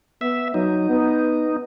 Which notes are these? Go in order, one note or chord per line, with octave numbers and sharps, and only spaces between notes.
B3 E5
F#3 D#4
B3